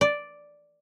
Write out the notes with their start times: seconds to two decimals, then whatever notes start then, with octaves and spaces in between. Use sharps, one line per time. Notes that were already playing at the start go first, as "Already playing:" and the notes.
0.01 D5